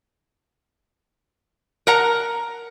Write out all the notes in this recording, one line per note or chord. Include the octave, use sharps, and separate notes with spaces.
A#4 F#5 A#5